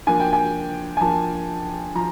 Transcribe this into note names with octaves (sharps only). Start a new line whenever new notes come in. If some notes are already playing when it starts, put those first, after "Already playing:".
F3 A#3 D4 G#5
G5
G#5
G#5
F3 A#3 D4 A5
F3 A#5